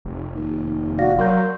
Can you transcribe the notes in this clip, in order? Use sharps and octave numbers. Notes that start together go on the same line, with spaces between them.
F1
D#2
F#4 D5 F5 A#6
F#3 A#4 C6 C#6 G6